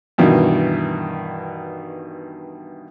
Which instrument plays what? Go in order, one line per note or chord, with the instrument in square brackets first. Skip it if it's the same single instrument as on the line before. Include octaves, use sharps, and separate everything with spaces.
[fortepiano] G2 B2 D#3 E3